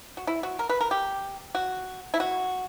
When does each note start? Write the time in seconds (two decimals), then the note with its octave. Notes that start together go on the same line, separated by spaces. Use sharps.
0.17 F#4
0.27 E4
0.43 F#4
0.59 A#4
0.69 B4
0.81 A#4
0.91 G4
1.55 F#4
2.14 E4
2.20 F#4